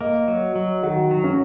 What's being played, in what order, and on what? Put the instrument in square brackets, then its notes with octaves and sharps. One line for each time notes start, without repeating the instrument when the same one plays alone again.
[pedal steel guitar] A#3 [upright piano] D#5
[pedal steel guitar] F#3
F#3
[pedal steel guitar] D#3 [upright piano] F#4
[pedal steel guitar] F#3
[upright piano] C#4